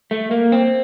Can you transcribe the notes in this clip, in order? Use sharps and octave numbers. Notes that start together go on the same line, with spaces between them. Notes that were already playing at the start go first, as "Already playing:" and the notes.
A3
A#3
C4